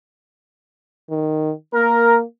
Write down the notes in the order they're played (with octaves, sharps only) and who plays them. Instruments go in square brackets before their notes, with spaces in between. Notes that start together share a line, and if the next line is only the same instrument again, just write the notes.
[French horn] D#3
[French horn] A#3 [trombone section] A#4